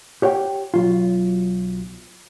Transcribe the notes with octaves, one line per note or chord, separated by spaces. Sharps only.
G4 C#5 F#5 G5
B1 F#3 F4